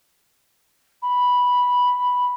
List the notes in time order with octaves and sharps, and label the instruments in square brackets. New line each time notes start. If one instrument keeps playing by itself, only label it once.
[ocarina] B5